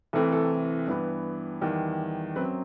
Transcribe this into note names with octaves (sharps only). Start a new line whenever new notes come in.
C2 C3 E3 A3 C4 A4
A4
G2 E3 B3
E2 D#3 G3
F#2 F#3 C4 B4